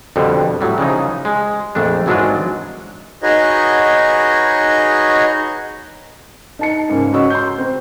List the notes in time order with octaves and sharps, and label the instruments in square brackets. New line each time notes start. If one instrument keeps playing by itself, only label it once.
[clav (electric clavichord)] F2 B2 D3 G3
A2 F#3 G3
C#3 E3 F3 D#4
G#3
A#1 F2 A3 D4
G#1 E3 F#3 G#3 D4 F4
[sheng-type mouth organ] D#4 F#4 G#4 B4 C#5 D#5
[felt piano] D#4 A5 C#7
G#2 C#3 A#3
C#3 F#4 C#5 D#5 C#6 E6
C6 G6
C4